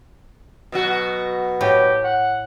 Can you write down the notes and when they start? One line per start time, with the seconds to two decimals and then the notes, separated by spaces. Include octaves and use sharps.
0.72 B2 F#3 F#4
1.61 A2 G4
2.04 F#5